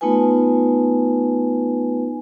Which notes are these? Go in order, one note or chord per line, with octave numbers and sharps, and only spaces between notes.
A3 B3 D#4 F4 B4 G#5